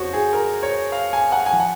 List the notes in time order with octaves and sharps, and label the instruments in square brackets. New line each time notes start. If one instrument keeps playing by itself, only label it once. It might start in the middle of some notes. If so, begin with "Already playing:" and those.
Already playing: [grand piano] F2 C#3 F3 F#4 C5 C#5
G#4
A#4
C#5
F5
G#5
F#5
G#5
F3
F#5